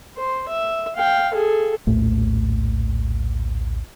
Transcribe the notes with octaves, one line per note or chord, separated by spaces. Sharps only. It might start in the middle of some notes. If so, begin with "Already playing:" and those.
C5
E5
F5 G5
G#4 A4
A#1 D#2 A2 A3